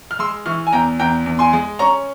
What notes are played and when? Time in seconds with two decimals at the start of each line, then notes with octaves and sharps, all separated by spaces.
0.11 F6
0.19 G#3 C6 E6
0.46 E3 C#6 F6
0.67 G#5
0.72 E2 G5 A#5
0.99 E2 G5 A#5
1.26 E2
1.39 G#5 C6
1.53 G#3
1.79 C#4 A#5 C#6